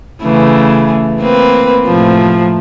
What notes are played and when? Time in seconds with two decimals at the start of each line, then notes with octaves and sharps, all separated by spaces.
0.22 C#3 E3 A3
1.20 A#3 C4 B4
1.86 A2 C3 F3